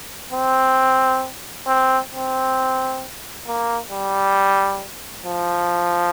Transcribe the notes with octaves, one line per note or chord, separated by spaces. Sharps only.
C4
C4
C4
A#3
G3
F3